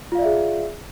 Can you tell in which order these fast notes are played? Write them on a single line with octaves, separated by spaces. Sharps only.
F4 F5 D5 E5 G#4